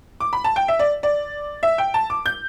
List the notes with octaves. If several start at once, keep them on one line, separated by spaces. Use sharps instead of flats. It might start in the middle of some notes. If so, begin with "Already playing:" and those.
D6
B5
A5
G5
E5
D5
D5
E5
G5
A5
D6
G6